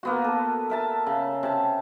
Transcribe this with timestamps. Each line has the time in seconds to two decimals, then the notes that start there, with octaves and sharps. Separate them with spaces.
0.03 A#3 B3 F#4
0.24 A4
0.70 A#4 E5 A5
1.06 C#3
1.43 C3 A5